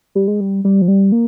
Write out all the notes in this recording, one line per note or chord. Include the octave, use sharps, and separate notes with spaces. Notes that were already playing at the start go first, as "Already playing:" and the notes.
G3
G#3
G3
G3
F3
G3
A#3